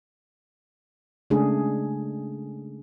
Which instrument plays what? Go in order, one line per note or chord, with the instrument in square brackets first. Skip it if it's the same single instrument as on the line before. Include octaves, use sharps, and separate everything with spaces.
[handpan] C#3 G#3 A3 D4 G#4